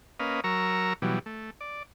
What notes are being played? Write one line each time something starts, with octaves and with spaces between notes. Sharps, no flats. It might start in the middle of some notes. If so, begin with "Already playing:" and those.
A#3 C#4 B4 D#5 F5
F#3 A#4 A#5 C#6 E6
B2 E3 F#3 G3
A3
D5